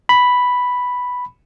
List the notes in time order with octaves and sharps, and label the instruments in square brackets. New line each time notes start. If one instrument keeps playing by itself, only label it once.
[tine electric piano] B5